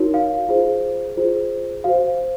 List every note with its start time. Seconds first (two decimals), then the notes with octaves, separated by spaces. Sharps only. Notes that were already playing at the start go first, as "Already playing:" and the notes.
Already playing: D#4 F#4 A#4 C#5
0.14 F5
0.49 F4 G#4 C5
1.16 F4 G#4 C5
1.84 F#4 C5 F5